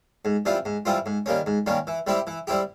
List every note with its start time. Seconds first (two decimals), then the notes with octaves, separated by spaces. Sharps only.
0.25 G#2
0.46 E3 G3 C4 F4
0.65 G#2
0.85 E3 G3 C4 F4
1.06 G#2
1.26 D#3 G3 A#3 C#4
1.46 G#2
1.66 D#3 G3 A#3 C#4
1.87 E3
2.07 G3 C4 E4 G4
2.27 E3
2.47 G3 C4 E4 G4